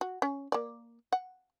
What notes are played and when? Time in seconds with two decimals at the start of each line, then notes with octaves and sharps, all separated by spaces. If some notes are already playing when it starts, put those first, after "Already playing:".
0.01 F#4
0.22 C#4
0.52 A#3 D5
1.12 F#5